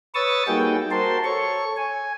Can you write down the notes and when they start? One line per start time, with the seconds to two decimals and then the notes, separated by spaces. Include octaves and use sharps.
0.15 B4 C#5 C#6 D#6 E6 A6
0.48 G3 A#3 D#4 F#4 G#4 G5
0.91 F#4 A#4 C5 A5 C6
1.24 A4 C#5 C#6
1.77 G#5